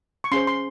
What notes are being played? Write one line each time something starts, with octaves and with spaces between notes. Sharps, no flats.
C#6
C#4 G#4 C5 C6
C6